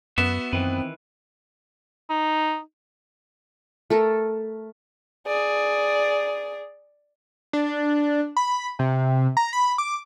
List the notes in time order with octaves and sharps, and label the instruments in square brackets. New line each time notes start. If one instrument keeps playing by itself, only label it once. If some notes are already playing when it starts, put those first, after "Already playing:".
[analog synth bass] F#2 [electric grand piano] B3 [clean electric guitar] F#4 E5
[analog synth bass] F#2 [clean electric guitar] D#3 E3 B4 [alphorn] C4
[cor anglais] D#4
[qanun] A3 A4 A#4
[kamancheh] G#4 D5
[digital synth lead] D4
B5
C3
A#5
B5
D6